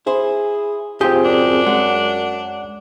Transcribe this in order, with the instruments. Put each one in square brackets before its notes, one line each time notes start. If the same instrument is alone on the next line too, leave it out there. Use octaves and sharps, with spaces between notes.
[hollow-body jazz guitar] E4 C5 [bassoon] G#4
[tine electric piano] C4 F4 G#4 [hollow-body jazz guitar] G4 G5
[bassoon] F#2 [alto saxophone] D4
[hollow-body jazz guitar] G#3 [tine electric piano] F#5